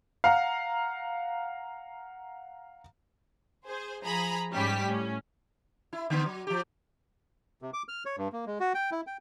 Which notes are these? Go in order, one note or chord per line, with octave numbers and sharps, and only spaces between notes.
F5 F#5 A#5
G#4 C5
F3 G#4 A#5 B5
G#2 G3 C#4 G4 B6
A2 C#4
E4
D3 B3
F#3
F3 G4
C3
D6
F6
C#5
G2
A#3
G#3
F#4
G5
E4
G5